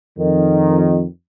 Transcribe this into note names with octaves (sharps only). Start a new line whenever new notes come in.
F2 D#3